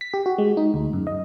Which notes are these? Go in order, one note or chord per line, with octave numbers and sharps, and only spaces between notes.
B6
G4
F#4
G#3
D#4
D2
F#2
D#5